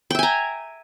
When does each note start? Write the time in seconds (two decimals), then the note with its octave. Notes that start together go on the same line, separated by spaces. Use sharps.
0.11 G5
0.15 E5
0.19 G#5
0.23 A#5